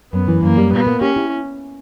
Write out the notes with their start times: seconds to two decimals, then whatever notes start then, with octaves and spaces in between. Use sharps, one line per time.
0.12 F#2 B3
0.28 E3
0.42 F#2 A#3
0.57 G3
0.72 A#2 B3
0.87 A#3
1.01 C#4 G4
1.16 E4